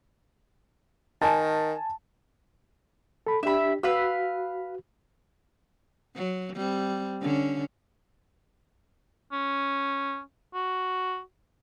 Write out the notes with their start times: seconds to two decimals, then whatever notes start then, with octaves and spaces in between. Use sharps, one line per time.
1.22 D#3 G#5 A5
3.27 A4 B5
3.43 D4 G4 E5 B5
3.83 F#4 B4 F5 E6
6.16 F#3
6.56 G3 C4
7.22 D3 C#4
9.32 C#4
10.54 F#4